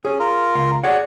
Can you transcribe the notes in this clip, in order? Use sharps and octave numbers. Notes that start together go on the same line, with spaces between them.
C#4 G#4
F4 A#4
C#2 F5
F#4 G#4 C#5 D5 F#5